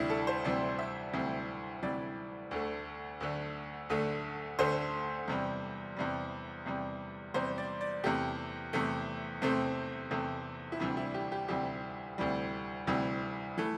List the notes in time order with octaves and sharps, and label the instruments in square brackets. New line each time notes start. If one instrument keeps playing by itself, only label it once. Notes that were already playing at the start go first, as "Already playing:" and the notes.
Already playing: [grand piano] D2 C3 E3 G3 D4 E4
A4
C5
D2 C3 E3 G3 D5
E5
D2 C3 E3 G3
D2 C3 E3 G3 D5
D2 D3 A3
D2 D3 A3
D2 D3 A3
D2 D3 A3 C5
E2 C3 G3
E2 C3 G3
E2 C3 G3
E2 C3 G3 C5
D5
D5
E2 C3 A3 G4
E2 C3 A3
E2 C3 A3 C4
E2 C3 A3
E4
D2 C3 E3 G3 D4
E4
G4
G4
D2 C3 E3 G3 G4
D2 C3 E3 G3
D2 C3 E3 G3
E3 A3